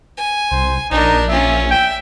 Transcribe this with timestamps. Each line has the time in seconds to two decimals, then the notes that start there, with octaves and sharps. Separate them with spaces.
0.17 G#5
0.51 C2 C5
0.91 A#1 D4 D#4 A#4
1.29 C#4 F4 E5
1.71 E5 G5